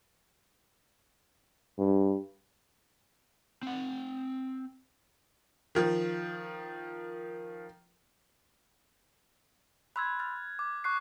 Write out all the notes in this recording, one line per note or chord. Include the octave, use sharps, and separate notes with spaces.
G2
C4 F#5
D#3 F3
B5 C6 E6 F#6 G#6
F6 A6
D6
C#6 F#6 C7